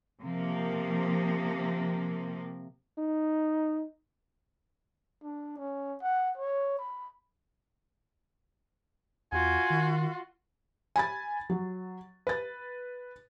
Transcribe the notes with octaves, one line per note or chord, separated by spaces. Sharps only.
C3 F3 A#3
D#4
D4
C#4
F#5
C#5
B5
E2 F4 F#4 G#5
D#3
G#5 B5 A6
F#3
B4 A6